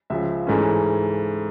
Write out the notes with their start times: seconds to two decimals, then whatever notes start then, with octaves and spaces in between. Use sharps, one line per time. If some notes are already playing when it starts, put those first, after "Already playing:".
0.10 C#2 C#3 F3 E5
0.47 G#2 E3 A3 C#4